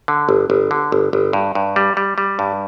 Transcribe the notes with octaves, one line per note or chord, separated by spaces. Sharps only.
D3
G1
G1
D3
G1
G1
G2
G2
G3
G3
G3
G2